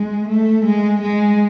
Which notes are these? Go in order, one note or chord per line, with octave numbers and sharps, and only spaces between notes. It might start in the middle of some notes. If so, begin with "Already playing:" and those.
Already playing: G#3
A3
G#3
G#3